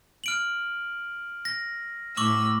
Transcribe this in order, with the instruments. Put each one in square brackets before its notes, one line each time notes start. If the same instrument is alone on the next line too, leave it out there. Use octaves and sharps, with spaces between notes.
[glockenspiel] F6 D7 F#7
A#6
[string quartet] A2 E6 [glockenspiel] C#6 D6 F#7